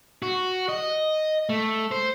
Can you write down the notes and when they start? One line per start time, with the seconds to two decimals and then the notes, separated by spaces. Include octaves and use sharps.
0.22 F#4
0.69 D#5
1.50 A3
1.91 C5